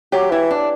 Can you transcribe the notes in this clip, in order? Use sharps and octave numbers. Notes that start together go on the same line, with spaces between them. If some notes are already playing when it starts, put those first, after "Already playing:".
F#3 G4
E3 E4
D4